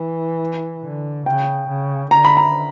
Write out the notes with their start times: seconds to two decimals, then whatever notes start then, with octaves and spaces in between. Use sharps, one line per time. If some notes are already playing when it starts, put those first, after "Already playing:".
Already playing: E3
0.83 D3
1.26 C#3 G5
1.68 C#3
2.11 D3 A#5
2.25 B5
2.37 A#5